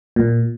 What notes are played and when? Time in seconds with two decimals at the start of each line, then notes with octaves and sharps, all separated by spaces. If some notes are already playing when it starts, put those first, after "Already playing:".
0.16 A#2